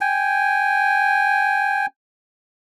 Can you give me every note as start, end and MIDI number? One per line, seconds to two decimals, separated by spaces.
0.01 1.86 79
0.01 1.86 80